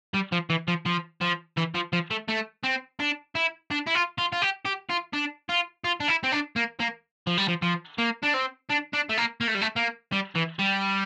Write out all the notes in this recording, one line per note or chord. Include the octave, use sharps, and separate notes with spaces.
G3
F3
E3
F3
F3
F3
E3
F3
F3
A3
A3
C4
D4
E4
D4
E4
F4
F4
F4
G4
G4
F4
D4
F4
F4
D4
E4
C4
D4
A#3
A#3
F3
G3
F3
F3
A#3
D4
C4
D4
D4
A3
A#3
A#3
A3
G3
A3
A#3
G3
E3
G3